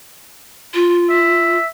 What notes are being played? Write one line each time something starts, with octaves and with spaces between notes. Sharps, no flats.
F4
E5